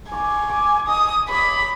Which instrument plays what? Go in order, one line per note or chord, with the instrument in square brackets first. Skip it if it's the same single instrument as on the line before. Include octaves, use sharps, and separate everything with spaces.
[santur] D5 C#6 [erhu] G#5
[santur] D6
[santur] D#5 [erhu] D#6
[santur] C#5 D5 [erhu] B5